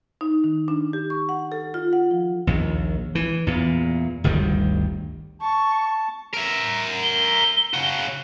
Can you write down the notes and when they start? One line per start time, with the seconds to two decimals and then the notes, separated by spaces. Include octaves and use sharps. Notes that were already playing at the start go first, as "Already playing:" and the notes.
0.21 D#4
0.44 D#3
0.68 D4
0.93 G4
1.10 C#6
1.29 F#5
1.52 A4
1.74 F4
1.93 F#5
2.11 F3
2.47 A#1 D#2
3.15 E3
3.47 E2 A#2
4.24 G1 D2 D#3 G3
5.42 A5 C#6
6.33 A#4 E5
7.03 G7
7.74 C#3 F#4